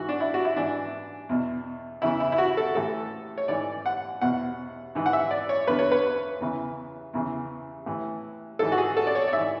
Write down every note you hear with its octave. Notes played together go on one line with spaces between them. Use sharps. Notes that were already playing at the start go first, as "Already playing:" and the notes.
Already playing: G#2 E3 F#4
D4
E4
F#4
E4
G#2 E3 D4
E2 B2
E2 C#3 E3 E4
E4
E4
F#4
A4
A2 E3 A4
C#5
G#2 E3 D5
F#5
E2 B2 F#5
G#2 E3
F#5
E5
D5
C#5
E2 D3 B4
C#5
B4
E2 C#3 E3
E2 C#3 E3
A2 E3
G#2 E3 A4
F#4
G#4
A4
D5
C#5
D5
G#2 E3 E5